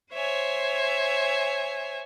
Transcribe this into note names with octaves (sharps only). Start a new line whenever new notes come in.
C5 C#5 E5 G#5